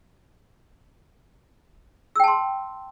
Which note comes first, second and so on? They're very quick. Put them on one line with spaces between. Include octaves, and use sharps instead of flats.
E6 G5 A5 C6